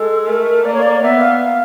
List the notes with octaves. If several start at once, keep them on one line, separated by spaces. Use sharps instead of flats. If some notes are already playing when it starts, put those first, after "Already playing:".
Already playing: G#3 A4
A3 A#4
A#3 D5
C#5
D5
B3 E5
F5
F5